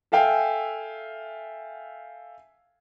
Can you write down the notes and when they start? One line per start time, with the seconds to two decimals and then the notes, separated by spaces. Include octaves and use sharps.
0.12 A4 E5 F5 G5 G#5